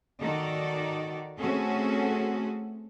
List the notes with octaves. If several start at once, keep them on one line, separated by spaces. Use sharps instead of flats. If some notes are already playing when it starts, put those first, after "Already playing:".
D#3 D#4 F#4 A4 D5
A3 C4 C#4 F#4 G#4 A4